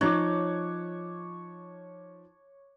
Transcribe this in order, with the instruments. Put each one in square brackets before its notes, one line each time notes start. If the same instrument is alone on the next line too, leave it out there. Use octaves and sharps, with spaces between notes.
[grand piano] F3 F#6 [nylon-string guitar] D#4 [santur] C#5 D6